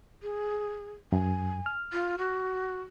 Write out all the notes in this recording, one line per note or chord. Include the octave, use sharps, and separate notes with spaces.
G#4
F#2 G#5
F6
F4
F#4